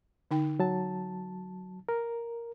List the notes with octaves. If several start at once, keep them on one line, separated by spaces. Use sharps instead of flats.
D3 D#4 G5
F#3 A5
A#4